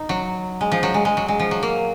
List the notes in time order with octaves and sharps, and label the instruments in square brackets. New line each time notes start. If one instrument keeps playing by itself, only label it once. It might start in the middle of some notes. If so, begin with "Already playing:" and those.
Already playing: [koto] D#4
F#3
G#3
F3
F#3
G#3
G#3
F#3
G#3
F3
F#3
A#3